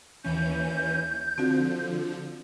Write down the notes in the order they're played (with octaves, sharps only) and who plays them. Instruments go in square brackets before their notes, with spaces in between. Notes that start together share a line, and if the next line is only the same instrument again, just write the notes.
[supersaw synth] D#2 E3 C#4 [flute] G6
[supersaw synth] D3 F3 [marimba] C4 F#4